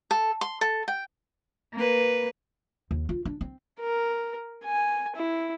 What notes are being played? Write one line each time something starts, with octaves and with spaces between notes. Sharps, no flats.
A4
C6
A4
G5
A#3 B4
D#2
F4
D4
C4
A#4
G#5
E4